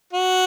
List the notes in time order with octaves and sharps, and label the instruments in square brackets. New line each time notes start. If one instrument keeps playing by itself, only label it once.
[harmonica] F#4